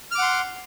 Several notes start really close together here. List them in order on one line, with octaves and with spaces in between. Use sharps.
F6 D6 F#5 C6